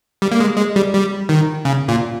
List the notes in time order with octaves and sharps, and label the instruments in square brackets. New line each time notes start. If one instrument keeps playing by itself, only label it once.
[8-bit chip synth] G3
A#3
G#3
G#3
G3
G3
D#3
C#3
A#2